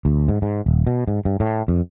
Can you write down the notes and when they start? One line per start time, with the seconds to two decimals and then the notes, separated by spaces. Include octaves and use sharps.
0.05 D2
0.28 G#2
0.42 G#2
0.66 D#1
0.87 B2
1.08 G#2
1.25 G2
1.40 A2
1.68 F2